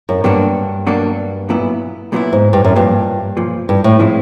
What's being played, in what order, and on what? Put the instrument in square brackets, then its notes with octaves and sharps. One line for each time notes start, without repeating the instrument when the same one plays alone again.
[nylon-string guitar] F#2
[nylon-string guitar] G2 [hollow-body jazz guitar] B2 F#3 A#3 D4 F#4
[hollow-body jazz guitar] B2 F#3 A#3 D4 F#4
B1 A#2 F#3 B3 E4
B1 A#2 F#3 B3 E4
[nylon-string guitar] G#2
G2
F#2
[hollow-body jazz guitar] B1 A#2 F3 [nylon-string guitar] G2
[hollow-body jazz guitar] B1 A#2 F3
[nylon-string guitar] G2
A2
[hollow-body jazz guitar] C3 F3 G#3 C4 E4